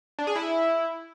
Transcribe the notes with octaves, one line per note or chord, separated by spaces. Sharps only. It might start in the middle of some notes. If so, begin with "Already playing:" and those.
D4
G#4
E4